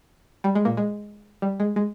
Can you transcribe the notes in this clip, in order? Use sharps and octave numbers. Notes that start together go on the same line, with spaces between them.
G3
G#3
A#2 A#3
G#3
G3
G#3
G#3